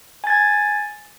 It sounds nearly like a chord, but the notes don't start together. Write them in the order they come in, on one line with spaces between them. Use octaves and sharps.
G#5 A6 G#6